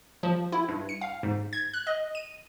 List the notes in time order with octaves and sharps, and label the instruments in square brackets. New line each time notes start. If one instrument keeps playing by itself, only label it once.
[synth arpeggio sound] F3
E4
G2
C#7
F5
G#2
G#6
F#6
D#5
D#7